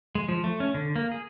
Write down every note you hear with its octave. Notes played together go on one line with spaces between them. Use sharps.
G#3
F3
A3
C#4
D3
A#3
G#4